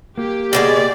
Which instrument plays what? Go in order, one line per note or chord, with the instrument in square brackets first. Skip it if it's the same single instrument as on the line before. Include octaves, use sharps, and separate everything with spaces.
[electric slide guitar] A#3 [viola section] G4
[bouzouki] B2 F#3 G#3 [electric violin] D5